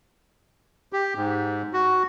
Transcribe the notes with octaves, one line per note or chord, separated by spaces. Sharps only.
G4
G#2
F#4